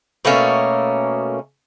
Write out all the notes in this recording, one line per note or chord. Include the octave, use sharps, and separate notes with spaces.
B2 A3 A#3 C#4